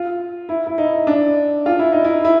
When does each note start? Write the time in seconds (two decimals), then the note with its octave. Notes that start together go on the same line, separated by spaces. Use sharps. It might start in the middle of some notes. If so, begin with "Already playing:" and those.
Already playing: F4
0.49 E4
0.67 E4
0.78 D#4
1.07 D4
1.66 F4
1.79 E4
1.92 D#4
2.04 E4
2.25 E4